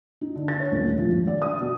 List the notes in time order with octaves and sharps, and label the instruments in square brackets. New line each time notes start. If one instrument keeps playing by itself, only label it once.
[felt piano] D#4
D3
A6
C#5
D#1
A2
F2
G#1
D5
D#6
B2